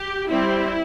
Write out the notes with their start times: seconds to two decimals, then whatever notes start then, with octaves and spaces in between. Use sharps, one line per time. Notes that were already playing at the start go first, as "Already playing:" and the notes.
Already playing: G4
0.30 G3 C4 E4